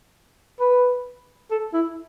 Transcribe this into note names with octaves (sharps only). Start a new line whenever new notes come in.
B4
A4
E4